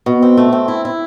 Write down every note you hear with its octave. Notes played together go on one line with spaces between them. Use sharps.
B2
C4
A3
C4
E4
E4